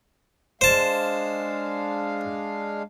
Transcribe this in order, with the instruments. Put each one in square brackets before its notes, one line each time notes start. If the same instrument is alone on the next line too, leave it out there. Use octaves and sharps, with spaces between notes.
[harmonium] G#3 D4 F5 [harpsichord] C5 A5